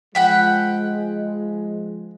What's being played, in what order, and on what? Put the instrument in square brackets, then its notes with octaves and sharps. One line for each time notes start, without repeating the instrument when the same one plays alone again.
[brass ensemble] F3 G#3 [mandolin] F#5 G5 B5